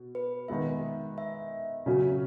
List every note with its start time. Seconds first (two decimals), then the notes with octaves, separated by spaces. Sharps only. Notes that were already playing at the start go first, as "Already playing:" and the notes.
Already playing: B2
0.15 B4
0.48 D#3 G#3 B3 E5
1.18 E5
1.86 C#3 F#3 C#4 F#4